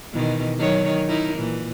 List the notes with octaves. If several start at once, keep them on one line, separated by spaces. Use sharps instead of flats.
B2 D#3 E3
D#3 F#3 C#5
D#4 E4 A#4
A#2 E3